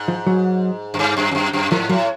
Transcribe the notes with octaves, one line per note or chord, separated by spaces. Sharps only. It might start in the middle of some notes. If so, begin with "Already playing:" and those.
Already playing: G#2
F3
F#3
F#2
G2
F#2
F2
F#2
F#2
G#2 F3
A2 F#3